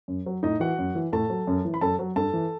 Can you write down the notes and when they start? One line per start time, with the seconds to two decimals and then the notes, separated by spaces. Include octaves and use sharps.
0.08 F#2
0.26 F#3
0.43 A2 D#4 D#5
0.60 E3 F#4 F#5
0.79 F#2
0.95 E3
1.12 A2 A4 A5
1.30 F#3
1.47 F#2
1.65 E3
1.74 B5
1.81 F#2 A4 A5
1.99 F#3
2.16 G2 A4 A5
2.33 E3